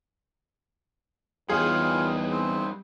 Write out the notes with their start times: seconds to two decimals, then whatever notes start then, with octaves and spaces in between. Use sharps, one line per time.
1.49 E2 G3 D#4 F4 G#4 C#5
2.31 C4